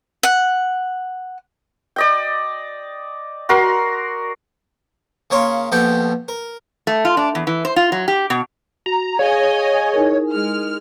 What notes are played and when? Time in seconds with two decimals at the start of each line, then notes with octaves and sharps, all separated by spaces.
0.23 F#5
1.96 D5 D#5 G5
3.49 F#4 A#4 C6
5.30 C#3 A#3 C#5 C6
5.72 A#1 B2 G4 A4 G5
6.28 A#4
6.87 A3
7.05 F4
7.17 D4
7.35 E2
7.47 E3
7.65 C5
7.76 F4
7.92 F#3
8.08 G4
8.30 B2
8.86 F#4 A#5
9.19 G#4 C#5 D#5 F5 G#5
9.93 D#4 E4 A#4
10.31 G#3 F6